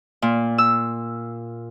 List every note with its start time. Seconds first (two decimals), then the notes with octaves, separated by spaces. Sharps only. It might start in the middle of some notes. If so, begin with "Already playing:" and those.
0.22 A#2
0.58 E6